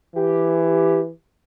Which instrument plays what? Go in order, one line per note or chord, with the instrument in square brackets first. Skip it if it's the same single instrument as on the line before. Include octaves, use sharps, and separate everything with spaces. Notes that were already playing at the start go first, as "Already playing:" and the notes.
[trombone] E3 [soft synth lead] G4